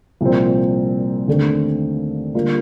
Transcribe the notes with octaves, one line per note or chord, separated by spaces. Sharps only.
C2 A#2 F3 C4
D#2 D3 A3 C4
D3 G3 A#3 F4